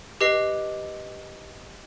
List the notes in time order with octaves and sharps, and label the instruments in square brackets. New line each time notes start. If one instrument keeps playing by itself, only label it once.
[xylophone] G4 B4 D#5 C7